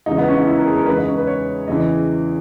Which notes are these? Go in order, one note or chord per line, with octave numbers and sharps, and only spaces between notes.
E2 C#3 E3 G#3 D#4
B3
C#4
D#4
E4
A#4
G#4
A#4
E2 C#3 G#3 B4
D#4
C#4
B4
C#5
E2 C#3 E3 D#5